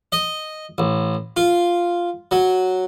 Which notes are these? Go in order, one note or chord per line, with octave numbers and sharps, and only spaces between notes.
D#5
A1
F4
F#3